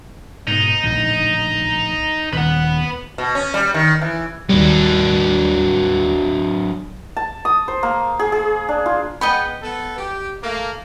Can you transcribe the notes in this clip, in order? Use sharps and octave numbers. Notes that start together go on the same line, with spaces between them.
G#2 B2 D#4
A#1 A2 D3
D#1 D#2 B4 F#5
B2
C#4
G3
D#3
E3
D#2 F#3 G3 D4
A5
D#6
C5
A#3
G#4
G#4
D4
F4
G#3 B3 D#5 G5 B5
B3 A4
G4
A3 A#3